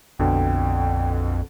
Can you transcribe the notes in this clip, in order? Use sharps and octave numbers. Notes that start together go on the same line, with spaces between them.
A#1 F2 B2 D3 G5